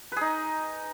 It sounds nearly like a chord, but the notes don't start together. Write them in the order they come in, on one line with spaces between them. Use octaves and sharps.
B4 G#4 D#4